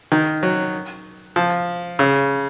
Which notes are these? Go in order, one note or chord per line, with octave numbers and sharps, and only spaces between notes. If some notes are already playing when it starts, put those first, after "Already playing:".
D#3
F#3
F3
C#3